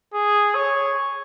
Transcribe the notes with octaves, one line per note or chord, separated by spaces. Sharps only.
G#4
C#5